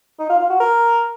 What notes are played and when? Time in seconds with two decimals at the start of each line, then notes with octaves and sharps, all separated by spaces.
0.19 D#4
0.29 F4
0.40 F4
0.50 F#4
0.60 A#4